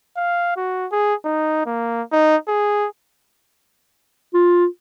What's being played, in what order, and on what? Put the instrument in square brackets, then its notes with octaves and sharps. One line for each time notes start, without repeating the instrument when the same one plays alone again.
[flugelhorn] F5
F#4
G#4
D#4
A#3
D#4
G#4
[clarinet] F4